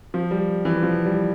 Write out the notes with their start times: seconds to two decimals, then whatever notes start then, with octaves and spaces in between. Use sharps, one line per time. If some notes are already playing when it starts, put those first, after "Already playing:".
0.14 F3
0.31 G3
0.65 E3
0.83 F3
1.06 G3